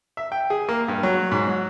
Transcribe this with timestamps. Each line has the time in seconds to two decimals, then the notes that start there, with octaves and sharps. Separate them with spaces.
0.17 E5
0.32 G5
0.50 G#4
0.69 A#3
0.88 G2
1.03 F#3
1.31 G#2
1.47 F#3